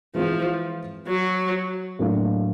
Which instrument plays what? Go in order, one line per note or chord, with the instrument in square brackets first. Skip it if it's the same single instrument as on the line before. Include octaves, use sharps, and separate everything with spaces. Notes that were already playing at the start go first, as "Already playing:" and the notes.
[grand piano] E3 G#3 C4 F4 [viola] F3
[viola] F#3
[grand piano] A2 F#3 A#3 D4 F4